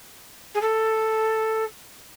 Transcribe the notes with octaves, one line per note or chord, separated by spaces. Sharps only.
G#4
A4